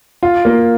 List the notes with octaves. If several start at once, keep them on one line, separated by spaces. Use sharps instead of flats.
F4
A#3